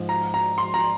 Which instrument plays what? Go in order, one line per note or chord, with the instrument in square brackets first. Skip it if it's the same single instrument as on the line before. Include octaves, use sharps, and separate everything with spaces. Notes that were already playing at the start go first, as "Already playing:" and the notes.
Already playing: [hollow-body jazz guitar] G#2 F3
[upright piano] A#5
A#5
C6
A#5